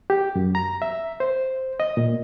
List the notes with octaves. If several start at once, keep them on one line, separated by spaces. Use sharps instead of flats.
G4
F#2
A#5
E5
C5
D#5
A#2